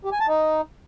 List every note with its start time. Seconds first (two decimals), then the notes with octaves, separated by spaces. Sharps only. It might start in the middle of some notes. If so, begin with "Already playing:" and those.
0.05 G4
0.12 G#5
0.20 A5
0.27 D#4